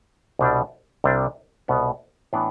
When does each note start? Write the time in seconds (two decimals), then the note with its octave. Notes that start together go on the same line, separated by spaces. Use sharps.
0.39 C2 B2 G3 D4
1.04 C2 C3 G3 D4
1.68 C2 B2 B3
2.33 A2 E3 B3 D4